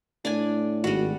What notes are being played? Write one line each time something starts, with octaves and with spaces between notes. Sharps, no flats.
A2 D4 D5 G#5
G#1 G3 F#4